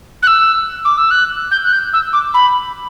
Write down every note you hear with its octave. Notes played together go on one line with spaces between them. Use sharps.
F#6
E6
D6
E6
F#6
G6
F#6
G6
E6
D6
B5